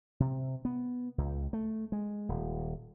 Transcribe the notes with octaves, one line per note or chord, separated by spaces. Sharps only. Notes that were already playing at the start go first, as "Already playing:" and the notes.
C3
B3
C#2
A3
G#3
D#1